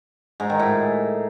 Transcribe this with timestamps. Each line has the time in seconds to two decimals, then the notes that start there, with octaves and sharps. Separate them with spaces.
0.40 G#2
0.50 D#3
0.59 A2